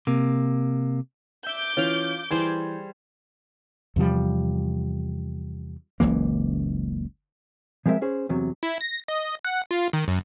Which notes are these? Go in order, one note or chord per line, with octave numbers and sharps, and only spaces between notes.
C3 A#3
E5 D6 G6
E3 C#4 F4 F5
E3 G3 G#4 C5 G#6
E2 C3 F3 G3
F#1 C#2 E3 A#3
F3 G#3 C4 A#4 E5
C#4 G#4 C5
E2 C3 F#3
E4
A#6
D#5
F#5
F4
D#3
F#2